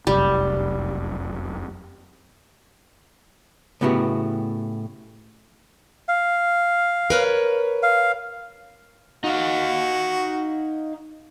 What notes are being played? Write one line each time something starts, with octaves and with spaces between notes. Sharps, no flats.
F1 C2 F#2 G3
A2 C#3 B3 E4 F#4 G4
F5
A#4 B4 C#5
F5
D#4 F#4 F5